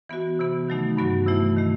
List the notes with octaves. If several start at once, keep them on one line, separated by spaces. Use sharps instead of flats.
E3 B3 F#4
C3 E3 B3
D#3 F#3 A3 D#4
G2 F#3 B3 F#4
C3 E3 A3 E4
D#3 A3